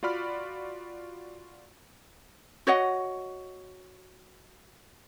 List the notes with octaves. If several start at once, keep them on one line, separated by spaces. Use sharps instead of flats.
F4 F#4 D5 B5 F6
F#4 C#5 D#5 F#5